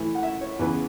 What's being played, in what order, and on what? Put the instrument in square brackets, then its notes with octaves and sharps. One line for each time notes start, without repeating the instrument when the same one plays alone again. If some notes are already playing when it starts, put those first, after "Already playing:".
Already playing: [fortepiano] A2 E3
F#5
E5
C#5
E2 C#3 E3 B4